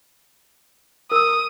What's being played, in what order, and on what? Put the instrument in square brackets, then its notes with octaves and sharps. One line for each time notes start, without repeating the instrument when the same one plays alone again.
[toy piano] A#4 E6 [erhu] D#6